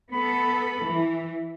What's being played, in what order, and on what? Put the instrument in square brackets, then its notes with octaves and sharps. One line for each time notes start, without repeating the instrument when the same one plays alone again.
[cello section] B3 A4 [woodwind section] B5
[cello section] E3